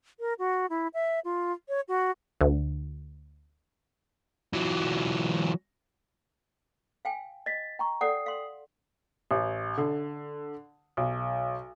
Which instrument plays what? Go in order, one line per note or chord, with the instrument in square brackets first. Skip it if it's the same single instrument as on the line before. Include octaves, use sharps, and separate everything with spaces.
[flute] A#4
F#4
E4
E5
F4
C#5
F#4
[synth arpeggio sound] D2
[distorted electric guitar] E3 F#3
[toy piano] F5 G5 G#5
[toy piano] D#5 [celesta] A6 B6
[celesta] G5 A#5 C#6
[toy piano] A4 D5 F#5 [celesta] G5 D#6 C7
[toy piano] F5 C6
[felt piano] A1
D3
B1